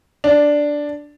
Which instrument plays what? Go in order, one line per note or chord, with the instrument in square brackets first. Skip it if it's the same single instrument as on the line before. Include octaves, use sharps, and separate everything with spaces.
[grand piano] D4